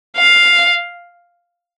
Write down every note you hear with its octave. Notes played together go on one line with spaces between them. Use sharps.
F5